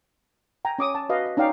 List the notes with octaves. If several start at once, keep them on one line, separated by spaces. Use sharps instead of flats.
G5 G#5 A#5
C#4 D6 D#6
A5
F#4 B4 D#5 F5
D#5
C#4 D#4 D5 F5 G5